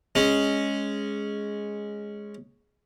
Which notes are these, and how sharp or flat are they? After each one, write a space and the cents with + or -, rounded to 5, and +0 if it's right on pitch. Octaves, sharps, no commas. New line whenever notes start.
G#3 +0 C#4 +0